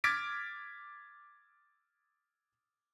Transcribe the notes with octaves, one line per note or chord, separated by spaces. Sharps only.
D6 F6 G#6 A6 B6 D7